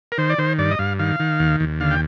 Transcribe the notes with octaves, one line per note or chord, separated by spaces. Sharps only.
A#4
D#3 C5
D5
D#3 C5
G2 D5
D#5
G2 F5
D#3 F5
D#3
D#2
D#2
D3 F5
G5